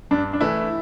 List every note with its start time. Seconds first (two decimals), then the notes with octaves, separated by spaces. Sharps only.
0.11 G2 D4
0.33 D4
0.41 E3 A3 E4